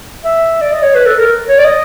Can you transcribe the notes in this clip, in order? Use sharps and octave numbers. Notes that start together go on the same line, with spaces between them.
E5
D5
D#5
C#5
B4
A4
A#4
C#5
D5
D#5